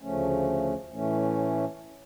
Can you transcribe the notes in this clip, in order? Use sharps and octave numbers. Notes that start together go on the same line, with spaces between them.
D2 C#3 F3 A3 C#4
A2 E3 A3 C#4